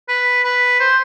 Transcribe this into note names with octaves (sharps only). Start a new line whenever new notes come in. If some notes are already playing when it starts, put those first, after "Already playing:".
B4
B4
C5